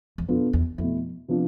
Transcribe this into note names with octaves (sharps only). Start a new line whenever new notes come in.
E2
F2 B2 B3 D4 F4 A4
E2
F2 B2 A3 E4
C3 F3 B3 D4 F4